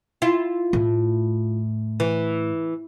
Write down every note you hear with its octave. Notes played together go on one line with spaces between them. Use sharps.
E4 F4
A2
E3